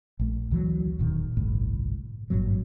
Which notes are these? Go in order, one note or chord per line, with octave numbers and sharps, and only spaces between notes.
A#1 A3
D2 E3 F#3
E1 A#2 D#3
G1 C2 A2
G#1 G2 A#2 F#3